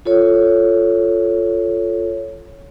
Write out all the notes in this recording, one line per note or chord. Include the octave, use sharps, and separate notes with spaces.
F4 A4 C#5